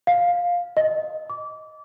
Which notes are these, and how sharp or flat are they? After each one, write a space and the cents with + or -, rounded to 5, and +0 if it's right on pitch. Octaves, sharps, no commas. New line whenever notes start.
F5 +10
D#5 +5
D6 -25